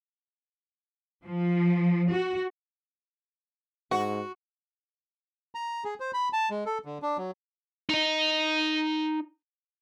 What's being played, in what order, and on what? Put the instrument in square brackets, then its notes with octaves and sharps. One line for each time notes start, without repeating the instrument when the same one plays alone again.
[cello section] F3
F#4
[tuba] G#2 [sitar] F#4 [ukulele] F#5
[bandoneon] A#5
G#4
C5
B5
A5
G#3
A4
D3
D4
F#3
[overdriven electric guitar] D#4 D#5